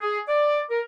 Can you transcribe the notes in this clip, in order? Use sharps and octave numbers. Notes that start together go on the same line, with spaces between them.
G#4
D5
A#4